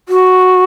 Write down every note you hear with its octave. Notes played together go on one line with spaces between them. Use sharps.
F#4